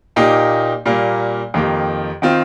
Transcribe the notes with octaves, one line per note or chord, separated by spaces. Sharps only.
A#2 A#3 D#4 G4
A#2 G3 A#3
F2 D#3 A#3 G4
D#3 C4 F4